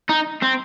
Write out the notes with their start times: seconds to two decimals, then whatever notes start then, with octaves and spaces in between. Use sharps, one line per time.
0.09 D#4
0.42 C4